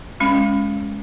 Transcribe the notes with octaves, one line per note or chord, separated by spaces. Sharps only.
G#3 C#4